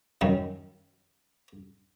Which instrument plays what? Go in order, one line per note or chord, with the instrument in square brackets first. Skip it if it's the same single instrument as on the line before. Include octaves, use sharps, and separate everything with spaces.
[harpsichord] F#2 D#3